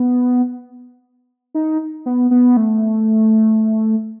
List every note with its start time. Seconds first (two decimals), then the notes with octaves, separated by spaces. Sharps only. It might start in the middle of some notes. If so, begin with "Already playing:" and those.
Already playing: B3
1.55 D#4
2.06 B3
2.31 B3
2.57 A3